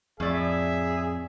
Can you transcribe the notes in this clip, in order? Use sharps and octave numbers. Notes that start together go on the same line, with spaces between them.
F2 A2 G#4 D5 E5